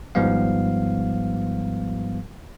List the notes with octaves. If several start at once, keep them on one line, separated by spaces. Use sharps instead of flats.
G#1 G#2 F3 G3 B3 F5